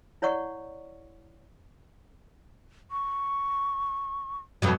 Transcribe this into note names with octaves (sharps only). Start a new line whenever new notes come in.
E4 C#5 D5 F#5 C#6
C#6
F2 B2 F#3